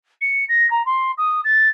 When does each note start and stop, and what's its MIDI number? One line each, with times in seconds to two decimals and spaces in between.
0.21 0.44 97
0.48 0.68 94
0.70 0.84 82
0.85 1.11 84
1.17 1.40 87
1.44 1.68 93